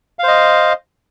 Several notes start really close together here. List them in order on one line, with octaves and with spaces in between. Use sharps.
F5 C5 D#5